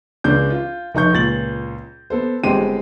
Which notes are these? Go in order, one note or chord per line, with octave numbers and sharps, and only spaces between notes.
C#2 C#3 D4 G6
F4
F1 D#4 C#6 G6
C#2 A#2 A6 F#7
B3 A4 C5
G1 G#3 C4 G4 C6 D#7